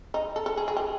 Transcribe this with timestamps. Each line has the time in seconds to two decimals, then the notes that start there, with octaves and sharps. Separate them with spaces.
0.14 D#4
0.36 A4
0.46 A4
0.57 G#4
0.68 G#4
0.76 G4